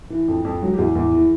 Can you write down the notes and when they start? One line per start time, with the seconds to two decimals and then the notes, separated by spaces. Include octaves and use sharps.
0.10 E3
0.28 F2
0.45 F2
0.62 F#3
0.74 G4
0.78 E2 G#4
0.95 E2
1.12 E3